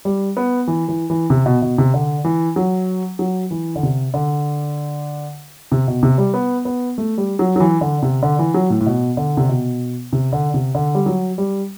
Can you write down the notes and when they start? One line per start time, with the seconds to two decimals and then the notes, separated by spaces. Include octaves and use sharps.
0.05 G3
0.37 B3
0.68 E3
0.88 E3
1.10 E3
1.30 C3
1.46 B2
1.62 B2
1.78 C3
1.94 D3
2.24 E3
2.56 F#3
3.19 F#3
3.51 E3
3.76 D3
3.83 C3
4.14 D3
5.72 C3
5.88 B2
6.03 C3
6.18 G3
6.34 B3
6.65 B3
6.98 A3
7.18 G3
7.39 F#3
7.56 F#3
7.60 E3
7.81 D3
8.02 C3
8.23 D3
8.39 E3
8.54 F#3
8.70 A2
8.81 A2
8.86 B2
9.17 D3
9.37 C3
9.49 B2
10.13 C3
10.33 D3
10.54 C3
10.75 D3
10.95 G3
11.06 F#3
11.38 G3